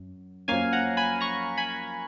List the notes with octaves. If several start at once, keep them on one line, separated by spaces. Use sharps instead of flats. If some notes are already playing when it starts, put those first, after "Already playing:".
Already playing: F#2
F#2 F3 A#3 C#4 F5 G#5
F#5 A#5
G#5 B5
A#5 C#6
G#5 B5